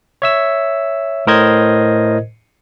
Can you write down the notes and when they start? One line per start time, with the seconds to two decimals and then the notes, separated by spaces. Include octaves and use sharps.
0.22 C#5 E5 E6
1.27 A2 A#4 C5 D#5 G#6